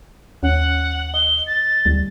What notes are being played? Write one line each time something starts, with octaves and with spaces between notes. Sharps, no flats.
D#2 C#4 F#5
D#5 G7
A6
D2 G3